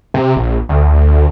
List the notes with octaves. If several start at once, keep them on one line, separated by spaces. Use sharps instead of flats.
C3
A#1
D2